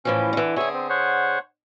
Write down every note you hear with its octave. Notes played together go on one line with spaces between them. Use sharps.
A2 E3 F3 C#4
D3 E3
D3 G#4 C#5 E5 G#5
C4
C5 C#5 F#5